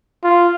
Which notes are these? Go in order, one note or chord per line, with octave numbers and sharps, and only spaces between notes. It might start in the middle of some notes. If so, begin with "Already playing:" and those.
F4